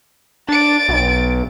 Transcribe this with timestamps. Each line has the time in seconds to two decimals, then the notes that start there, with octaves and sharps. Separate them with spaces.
0.49 D4 A6 D7
0.89 B1